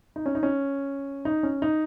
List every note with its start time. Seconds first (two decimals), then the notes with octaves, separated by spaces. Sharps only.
0.16 D#4
0.26 C#4
0.35 D#4
0.43 C#4
1.25 D#4
1.43 C#4
1.62 D#4